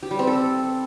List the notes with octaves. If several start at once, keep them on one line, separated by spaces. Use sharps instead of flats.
G4
G3
C4
A4